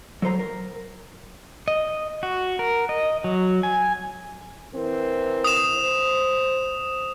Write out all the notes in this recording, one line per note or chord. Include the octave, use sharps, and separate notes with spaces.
F#3 A4 C5 A#5
A#4
D#5
F#4
A#4
D#5
F#3
G#5
E3 C4 A#4
D#6 E7
C5